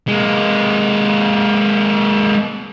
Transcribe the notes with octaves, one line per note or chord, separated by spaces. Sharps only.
G#3 A#3